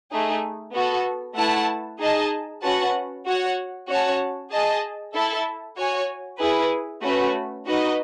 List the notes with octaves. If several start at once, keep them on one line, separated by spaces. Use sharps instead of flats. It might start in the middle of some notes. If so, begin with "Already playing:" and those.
A3 D#4 G#4
B3 F#4 A4
A3 E4 B4 F#5 A5
D#4 G#4 D#5 A5
C#4 F#4 B4 F#5 A5
F#4 C#5 F#5
C#4 F#4 C#5 F#5 A5
G#4 D#5 A5
E4 A4 E5 A5
F#4 C#5 G#5
E4 G#4 B4
A3 C#4 F#4 B4
D#4 F#4 B4 D#5